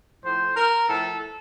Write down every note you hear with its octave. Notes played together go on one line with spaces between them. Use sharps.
A2 F3 C5
A#4
A2 F3 A4